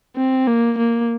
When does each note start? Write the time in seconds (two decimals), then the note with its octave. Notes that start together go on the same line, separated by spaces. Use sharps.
0.16 C4
0.47 A#3
0.78 A#3